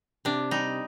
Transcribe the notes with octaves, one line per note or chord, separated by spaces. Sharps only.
C3 D4
G3 D#4